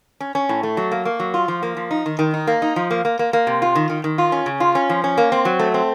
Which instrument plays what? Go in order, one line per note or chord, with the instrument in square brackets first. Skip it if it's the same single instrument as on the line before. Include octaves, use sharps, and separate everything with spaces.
[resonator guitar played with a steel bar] C#4
C#4
A2
A3
F#3
A#3
A#3
F#3
F4
F3
A#3
F3
D#4
D#3
D#3
D#4
A#3
D#4
F3
A#3
A#3
A#3
A#3
C3
F4
D#3
D#3
D#3
F4
C#4
C#3
F4
C#4
F3
C#4
A#3
C4
F#3
A3
C4